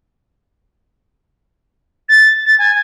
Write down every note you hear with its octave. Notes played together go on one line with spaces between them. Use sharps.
A6
A6
G#5